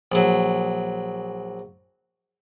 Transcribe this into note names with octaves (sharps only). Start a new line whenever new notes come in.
A#1 F#3